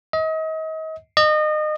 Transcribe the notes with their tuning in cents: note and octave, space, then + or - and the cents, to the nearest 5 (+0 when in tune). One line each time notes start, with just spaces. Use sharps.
D#5 +35
D#5 -30